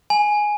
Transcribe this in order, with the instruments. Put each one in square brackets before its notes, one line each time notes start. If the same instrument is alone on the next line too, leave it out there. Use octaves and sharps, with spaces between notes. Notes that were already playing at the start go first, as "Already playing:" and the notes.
[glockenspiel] G#5